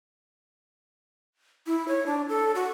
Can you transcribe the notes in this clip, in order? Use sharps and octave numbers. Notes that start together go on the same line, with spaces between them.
E4
C#5
D4
A4
F#4